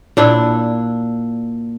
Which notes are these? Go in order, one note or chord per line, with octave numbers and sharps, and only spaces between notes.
A#2 D4 E4